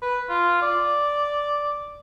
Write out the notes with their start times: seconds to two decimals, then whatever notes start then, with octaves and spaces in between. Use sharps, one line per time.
0.02 B4
0.29 F4
0.62 D5